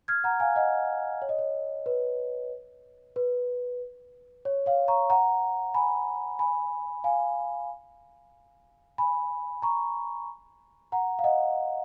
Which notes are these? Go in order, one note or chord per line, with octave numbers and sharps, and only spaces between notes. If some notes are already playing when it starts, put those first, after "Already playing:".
F6 G#6
F#5 A#5
F5 G#5
D#5 F#5
C#5
D#5
C#5
B4
B4
C#5
C#5 F5
A#5 C#6
F#5 A#5
G#5 B5
G#5 B5
F5 G#5
G#5 B5
A#5 C#6
F#5 A#5
F5
D#5 F#5